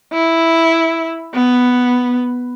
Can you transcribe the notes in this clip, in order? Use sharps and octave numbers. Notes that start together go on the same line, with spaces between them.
E4
B3